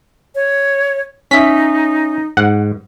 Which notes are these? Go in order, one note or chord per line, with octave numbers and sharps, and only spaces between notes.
C#5
C#4 D#4 E5 B6
G#2 F#5